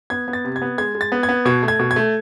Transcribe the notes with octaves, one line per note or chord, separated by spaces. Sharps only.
B3 G#6
B3
A6
C3
G#6
B3
G#3 G#6
G#3
A6
B3
G#6
B3
B2 G#6
A3
G#6
B2
G#6
A3